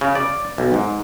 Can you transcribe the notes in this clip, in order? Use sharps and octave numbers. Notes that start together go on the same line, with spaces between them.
C#3
D5
B1
G#2